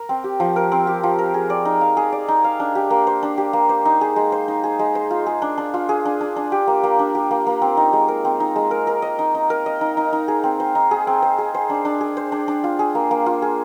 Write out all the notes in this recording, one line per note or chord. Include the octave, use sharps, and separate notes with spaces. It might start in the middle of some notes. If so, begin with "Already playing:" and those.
Already playing: A#4
C4
G4
F3
A#4
C4
G4
F3
A#4
G#4
D5
D#4
F5
G#4
D5
D#4
F5
D4
G4
A#3
C5
D4
G4
A#3
C5
D#4
G#4
G#3
C5
D#4
G#4
G#3
C5
F4
G#4
D4
D4
F4
G#4
D4
D4
D4
G4
A#3
A#3
D4
G4
A#3
A#3
C4
D#4
G#3
A#4
C4
D#4
G#3
A#4
A#4
D#5
D#4
D#4
A#4
D#5
D#4
D#4
D#4
G#4
C4
C5
D#4
G#4
C4
C5
G#4
C5
D4
D4
G#4
C5
D4
D4
F4
G#4
A#3
A#3
F4
G#4